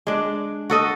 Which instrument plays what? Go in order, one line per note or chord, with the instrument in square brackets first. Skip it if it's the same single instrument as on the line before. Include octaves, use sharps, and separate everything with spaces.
[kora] G#3 D4
F#4 A4 D#5